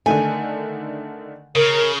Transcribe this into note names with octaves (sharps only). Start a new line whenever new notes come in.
D3 D#3 A3 G#5
C#3 A#4